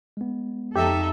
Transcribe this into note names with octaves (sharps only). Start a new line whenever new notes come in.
G#3 B3
F2 D#4 G4 A4 E5